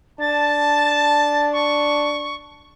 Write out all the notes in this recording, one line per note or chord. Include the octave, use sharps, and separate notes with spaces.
D4 A5 A6
C#6